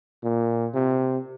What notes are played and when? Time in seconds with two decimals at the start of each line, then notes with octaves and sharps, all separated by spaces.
0.24 A#2
0.74 C3